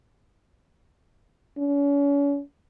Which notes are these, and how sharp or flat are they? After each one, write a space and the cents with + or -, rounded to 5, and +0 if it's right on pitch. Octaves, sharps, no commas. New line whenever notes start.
C#4 +40